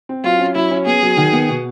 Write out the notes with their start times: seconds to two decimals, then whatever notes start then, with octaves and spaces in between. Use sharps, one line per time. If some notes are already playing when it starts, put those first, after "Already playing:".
0.09 C4
0.24 F#3 F4
0.39 C#4
0.55 F#3 E4
0.71 C#4
0.86 B3 G#4
1.02 F#3
1.17 D#3
1.33 B3
1.49 B2